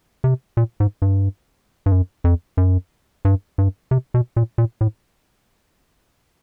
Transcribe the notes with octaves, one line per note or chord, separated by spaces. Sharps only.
C3
A#2
G#2
G2
G2
F#2
F2
F#2
G2
G2
C3
B2
A#2
A#2
A2